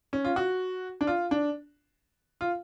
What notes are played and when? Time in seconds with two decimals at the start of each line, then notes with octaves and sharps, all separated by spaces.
0.13 C#4
0.25 F4
0.36 F#4
1.01 D4
1.07 F4
1.31 D4
2.41 F4